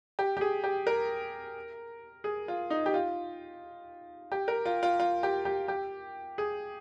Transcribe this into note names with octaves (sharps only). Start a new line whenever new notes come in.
G4
G4
G#4
G4
A#4
G#4
F4
D#4
G4
F4
G4
A#4
F4
F4
F4
G4
G4
G4
G#4